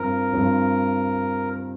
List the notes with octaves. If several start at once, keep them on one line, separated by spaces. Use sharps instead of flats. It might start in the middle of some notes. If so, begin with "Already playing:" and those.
Already playing: G2 F3 C4 A#4
G2 F3 C4